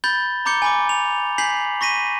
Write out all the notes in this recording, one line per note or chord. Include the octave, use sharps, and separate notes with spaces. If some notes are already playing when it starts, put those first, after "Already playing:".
B5 G6 A6 G7
A#5 B5 D6 G6 C#7 G7
G#5 B5 D6
F7
G#5 G6 B6 C7 F#7
C#6 A#6 B6 D#7